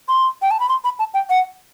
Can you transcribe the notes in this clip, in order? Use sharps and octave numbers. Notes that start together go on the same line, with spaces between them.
C6
G5
A5
B5
C6
B5
A5
G5
F#5